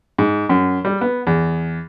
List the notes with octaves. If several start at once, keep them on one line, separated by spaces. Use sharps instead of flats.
G#2
F#2
G3
B3
E2